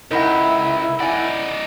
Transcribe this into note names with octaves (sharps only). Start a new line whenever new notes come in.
C#2 D#4 E4 A#4 F#5 B5
D#4 D5 F#5 G#5